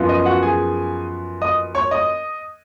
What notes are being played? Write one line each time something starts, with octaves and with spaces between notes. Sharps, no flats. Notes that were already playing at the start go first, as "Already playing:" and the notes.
Already playing: F#2 F3 B3 F4
D#5
F#4 F#5
G#4 G#5
D#5 D#6
C#5 C#6
D#5 D#6